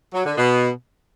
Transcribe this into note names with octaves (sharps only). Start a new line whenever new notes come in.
F#3
D3
B2